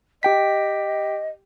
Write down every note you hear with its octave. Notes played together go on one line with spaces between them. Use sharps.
G4 D#5 G5 B6